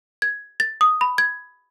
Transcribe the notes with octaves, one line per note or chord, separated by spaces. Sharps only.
G#6
A6
D#6
B5
G#6